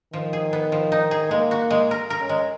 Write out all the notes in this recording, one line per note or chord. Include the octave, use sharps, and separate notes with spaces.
D#3 F3
G#4
B3
F3
D#4
G#4
G#3 A#3
F#4
G#3
A#4
A#4
C#4
G#3